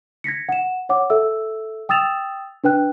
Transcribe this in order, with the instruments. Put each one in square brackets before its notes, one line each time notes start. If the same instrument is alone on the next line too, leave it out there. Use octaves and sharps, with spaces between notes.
[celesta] G#6 A#6 B6 C#7
F#5 E7
C#5 F#5 D6
A4 E5 E6
G5 D#6 E6 A6 E7 F7
D4 B4 G5 F#6